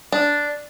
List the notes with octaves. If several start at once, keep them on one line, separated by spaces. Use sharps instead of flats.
D4